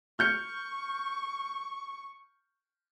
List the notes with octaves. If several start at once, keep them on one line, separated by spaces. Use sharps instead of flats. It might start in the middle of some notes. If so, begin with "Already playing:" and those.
C#6 F6 G6 C#7